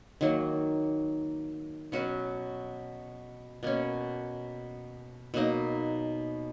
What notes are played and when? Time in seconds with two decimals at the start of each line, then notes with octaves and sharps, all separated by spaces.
0.21 D#3 F#3 A#3
1.92 B2 F#3 C#4 F#4
3.63 B2 A#3 C#4
5.34 B2 F#3 A#3 D#4